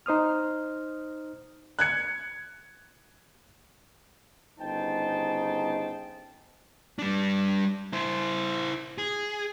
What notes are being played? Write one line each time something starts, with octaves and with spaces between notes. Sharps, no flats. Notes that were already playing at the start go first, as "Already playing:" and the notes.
D#4 C5 D#6 F6
F#6 G#6 C#7
G1 C#3 D#4 C5 G5 A5
G3 D4
E4 C5
G#4